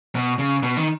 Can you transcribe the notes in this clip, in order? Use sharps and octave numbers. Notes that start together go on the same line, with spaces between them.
B2
C#3
B2
D#3